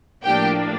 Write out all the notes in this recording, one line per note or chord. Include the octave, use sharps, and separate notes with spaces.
A2 F3 A#3 D4 G4 G5